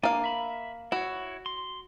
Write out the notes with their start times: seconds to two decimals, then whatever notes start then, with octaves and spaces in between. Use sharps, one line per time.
0.03 A#3 D4 F5 G#5
0.24 E5 B5
0.92 E4 F#4 C#5
1.46 C6